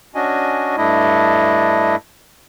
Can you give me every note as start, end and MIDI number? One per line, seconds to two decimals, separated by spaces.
0.15 0.76 61
0.15 0.76 62
0.15 0.76 66
0.15 0.76 75
0.15 0.76 80
0.77 1.96 43
0.77 1.96 57
0.77 1.96 62
0.77 1.96 64
0.77 1.96 75